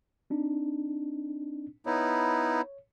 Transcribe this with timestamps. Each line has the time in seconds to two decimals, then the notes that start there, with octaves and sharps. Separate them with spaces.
0.30 C4 D4 D#4
1.86 B3 D#4 E4 C#5